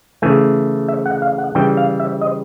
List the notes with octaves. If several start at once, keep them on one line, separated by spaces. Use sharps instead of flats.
C#3 E3 A3 G#5
E5
F#5
F5
F#5
C#3 E3 G3 G5
F5
E5
D#5